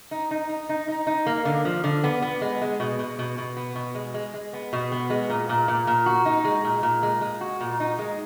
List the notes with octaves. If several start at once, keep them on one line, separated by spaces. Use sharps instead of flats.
D#4
D#4
D#4
D#4
D#4
D#4
A#3
D3
F3
D3
B3
B3
G#3
G#3
B2
B2
B2
B2
B3
B2
G#3
G#3
G#3
B3
B2
B3
G#3
A#2
A#2
A#2
A#2
F#4
D#4
G#3
A#2
A#2
G#3
G#3
F#4
A#2
D#4
G#3